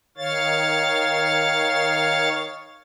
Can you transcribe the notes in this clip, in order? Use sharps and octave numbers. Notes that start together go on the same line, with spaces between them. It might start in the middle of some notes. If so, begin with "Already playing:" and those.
D#3 C#5 F5 A6